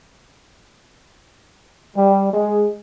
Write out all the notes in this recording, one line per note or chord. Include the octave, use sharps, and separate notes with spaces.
G3
G#3